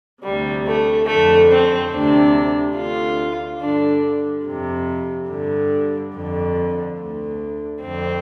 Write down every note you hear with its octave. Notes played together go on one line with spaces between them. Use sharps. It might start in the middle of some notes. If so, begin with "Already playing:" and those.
D2 C3 G3
A3
F2 D3 A3
C4
D2 C3 D4
D2 D3 F4
G2 D3 D4
F2 C3
G2 D3
F2 D3
D2 D3
F2 D3 C4